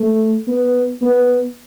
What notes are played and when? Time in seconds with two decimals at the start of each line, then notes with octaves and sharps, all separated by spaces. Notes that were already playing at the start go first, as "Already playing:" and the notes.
Already playing: A3
0.48 B3
1.02 B3